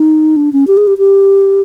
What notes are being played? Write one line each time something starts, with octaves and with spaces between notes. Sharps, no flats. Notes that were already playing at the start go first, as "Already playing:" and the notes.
Already playing: D#4
D4
C#4
G4
G#4
G4
G4